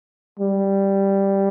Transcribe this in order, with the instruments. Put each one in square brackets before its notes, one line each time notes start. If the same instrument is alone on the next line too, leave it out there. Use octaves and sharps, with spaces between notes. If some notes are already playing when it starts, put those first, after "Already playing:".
[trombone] G3